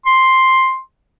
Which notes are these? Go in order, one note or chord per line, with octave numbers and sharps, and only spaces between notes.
C6